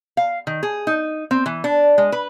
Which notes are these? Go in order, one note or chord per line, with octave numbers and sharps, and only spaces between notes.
F5
D#3
G#4
D#4
C4
E3
D4
G#3
B4